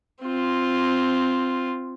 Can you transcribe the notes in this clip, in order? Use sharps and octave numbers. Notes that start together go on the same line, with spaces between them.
C4 F4